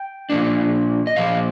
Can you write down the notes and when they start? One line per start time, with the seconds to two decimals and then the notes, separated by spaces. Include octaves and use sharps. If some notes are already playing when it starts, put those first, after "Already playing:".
Already playing: G5
0.30 A#2 F3 A#3 D4
1.07 D#5
1.16 A#2 F3 A#3 F5